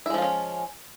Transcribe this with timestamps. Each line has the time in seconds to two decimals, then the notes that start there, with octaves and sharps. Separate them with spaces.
0.06 E4
0.10 G#3
0.14 F3
0.18 F4
0.22 C#4